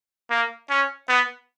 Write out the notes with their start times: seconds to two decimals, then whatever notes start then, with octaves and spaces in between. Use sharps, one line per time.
0.30 A#3
0.70 C#4
1.09 B3